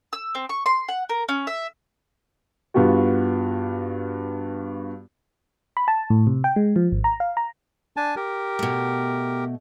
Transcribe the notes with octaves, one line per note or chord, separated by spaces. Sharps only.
E6
C4
C#6
C6
F#5
A#4
C#4
E5
G2 B3 F4 F#4
B5
A5
A2
C3
G5
G#3
F3
G#1
A#5
F5
A#5
D4 G#5 A5
G4 A#4
B2 A3